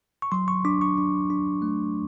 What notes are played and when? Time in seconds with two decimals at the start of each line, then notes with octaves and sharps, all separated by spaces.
0.22 C#6
0.32 F#3 C6
0.48 C#6
0.65 D4 D6
0.81 C#6
0.98 D4
1.30 D4
1.62 A3